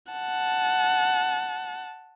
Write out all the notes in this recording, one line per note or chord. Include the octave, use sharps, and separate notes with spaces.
F#5 A5